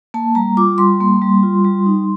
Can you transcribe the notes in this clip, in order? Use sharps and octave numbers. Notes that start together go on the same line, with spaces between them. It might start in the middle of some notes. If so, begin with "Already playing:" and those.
A#3 A5
G3 A#5
F4 D6
G3 C6
A#3
G3
F4
G3
D#4